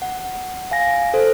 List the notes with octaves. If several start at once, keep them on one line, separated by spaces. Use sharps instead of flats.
F#5
F5 G#5 A#6
A4 C5